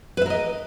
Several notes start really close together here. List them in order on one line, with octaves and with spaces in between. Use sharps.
B4 E5 A#4 D#5